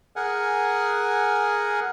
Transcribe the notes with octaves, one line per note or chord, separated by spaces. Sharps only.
G#4 A#4 F#5 G#5